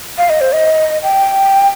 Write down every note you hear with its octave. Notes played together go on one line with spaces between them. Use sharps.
F5
D#5
C5
D#5
G5